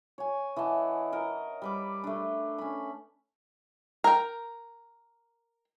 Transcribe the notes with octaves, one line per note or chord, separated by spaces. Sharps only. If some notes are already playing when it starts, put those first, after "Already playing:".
C#5 G#5
E3 D#5 F#5 A5
A#4 D#5
G3 B4 D6
A3 D4
C#4 B5
A#4 G5